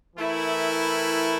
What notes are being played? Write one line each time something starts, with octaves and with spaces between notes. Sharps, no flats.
E3 A3 E4 A#4